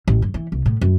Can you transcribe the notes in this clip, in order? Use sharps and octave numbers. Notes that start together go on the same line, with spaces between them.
A1
G2
E3
C2
A2
F#2